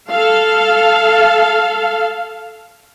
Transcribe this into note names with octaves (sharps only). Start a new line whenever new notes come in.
A4 F5